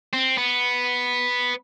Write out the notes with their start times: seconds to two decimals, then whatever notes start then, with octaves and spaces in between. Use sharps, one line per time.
0.13 C4
0.38 B3